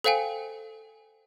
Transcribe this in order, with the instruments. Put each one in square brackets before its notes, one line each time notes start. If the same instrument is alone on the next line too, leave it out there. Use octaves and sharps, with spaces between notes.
[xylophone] A4 C5 F5 G5 G#5